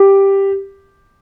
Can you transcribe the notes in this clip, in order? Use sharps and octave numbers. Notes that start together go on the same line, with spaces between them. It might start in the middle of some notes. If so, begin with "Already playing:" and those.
Already playing: G4